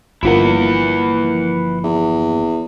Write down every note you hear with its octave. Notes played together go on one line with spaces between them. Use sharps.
G1 F3 A#3 E4 B4 F#5
E2